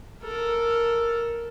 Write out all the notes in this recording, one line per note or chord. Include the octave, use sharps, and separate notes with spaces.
A4 A#4